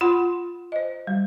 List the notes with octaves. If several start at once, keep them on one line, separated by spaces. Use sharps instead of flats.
F4 F#5 B5 C6
C5 D#5
G3